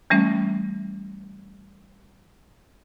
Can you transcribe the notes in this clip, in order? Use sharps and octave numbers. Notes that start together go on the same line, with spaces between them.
E3 G3 A3 C#4